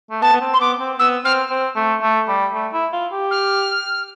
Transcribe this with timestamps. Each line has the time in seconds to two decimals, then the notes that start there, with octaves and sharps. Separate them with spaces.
0.11 A3
0.22 B3 A5
0.32 B3
0.41 C4
0.53 C6
0.60 B3 D6
0.79 C4
0.99 B3 E6
1.25 C4 F6
1.50 C4
1.76 A3
2.02 A3
2.28 G3
2.54 A3
2.73 E4
2.93 F4
3.12 G4
3.31 F6